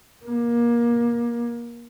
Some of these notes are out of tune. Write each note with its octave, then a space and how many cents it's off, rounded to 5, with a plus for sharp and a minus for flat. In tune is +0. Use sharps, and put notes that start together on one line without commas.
A#3 +25